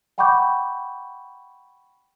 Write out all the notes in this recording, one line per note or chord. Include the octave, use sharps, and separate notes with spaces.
F#5 G5 B5 C#6 D6 G6